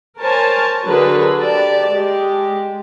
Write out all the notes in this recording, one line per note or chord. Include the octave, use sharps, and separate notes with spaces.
A#4 C5 C#5 G#5 A5
D3 F#3 D4 G#4 A#4 B4
G4 D5 A5
G#3 G4